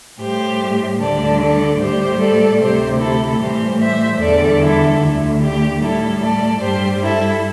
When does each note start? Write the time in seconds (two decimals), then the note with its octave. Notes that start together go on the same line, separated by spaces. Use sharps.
0.20 A2 G3 G4 C5
1.00 D2 D3 G3 A4 D5
1.40 A4 D5
1.79 A2 G3 G4 C5
2.20 A4 D5
2.60 D2 C3 A3 G4 C5
3.00 E4 A4
3.40 A2 E3 G3 G4 C5
3.80 C5 E5
4.20 E2 D3 G3 A4 D5
4.61 E4 A4
5.00 D2 D3 A3 E4
5.41 G4
5.81 A2 G3 E4 A4
6.21 A4 D5
6.61 G2 G3 G4 C5
7.02 E4 A4